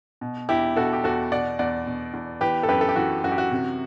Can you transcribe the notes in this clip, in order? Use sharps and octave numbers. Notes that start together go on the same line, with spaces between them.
B2
E2 E4 G4
B2 F#4 A4
G4
E2 F#4 A4
B2 D5 F#5
E2 D5 F#5
B2
E2
E3 G4 B4
A4
F#2 G4 B4
A4
G4
E3 F#4
F#2 F#4
G4
F#4
C3